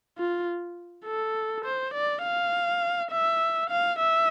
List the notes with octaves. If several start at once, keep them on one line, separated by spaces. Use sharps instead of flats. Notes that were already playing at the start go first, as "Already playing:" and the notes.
F4
A4
C5
D5
F5
E5
F5
E5